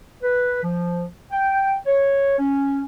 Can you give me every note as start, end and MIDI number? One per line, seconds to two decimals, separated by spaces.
0.23 0.62 71
0.63 1.04 53
1.31 1.75 79
1.85 2.38 73
2.38 2.82 61